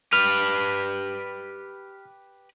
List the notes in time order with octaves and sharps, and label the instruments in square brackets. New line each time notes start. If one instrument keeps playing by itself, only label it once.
[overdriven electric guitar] G4 B4 [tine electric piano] F6